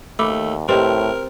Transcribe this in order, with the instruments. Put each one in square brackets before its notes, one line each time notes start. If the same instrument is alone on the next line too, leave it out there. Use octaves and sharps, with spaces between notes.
[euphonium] D#2 [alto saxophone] A3 [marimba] B5 D6
[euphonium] A2 [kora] C4 [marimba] G4 B4 D#5 [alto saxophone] A#4